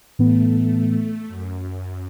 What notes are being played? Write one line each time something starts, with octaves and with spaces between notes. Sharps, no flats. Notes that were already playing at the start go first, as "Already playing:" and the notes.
A2 E3 A3 B3
F#2